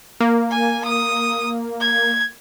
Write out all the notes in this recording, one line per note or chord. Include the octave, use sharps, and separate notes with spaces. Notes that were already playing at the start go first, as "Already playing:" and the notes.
A#3
G#5
D#6
G#6